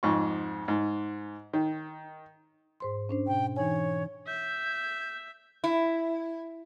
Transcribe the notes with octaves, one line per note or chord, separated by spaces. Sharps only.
F2 G#2 C#6
G#2
D#3
G#2 C5 C6
C#4 D4 C5
B2 G5
E3 D#4 C#5 G#5
E5 G6
E4